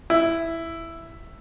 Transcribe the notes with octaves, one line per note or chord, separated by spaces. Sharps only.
E4